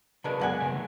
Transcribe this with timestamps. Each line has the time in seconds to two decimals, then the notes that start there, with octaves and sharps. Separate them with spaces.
0.24 C#3 G#3 D4 F#4 A#4 B4
0.40 F#2 G#3 B3 D5 F#5 G#5
0.60 C#3 F#3 A#4
0.74 C#3 A3 D#4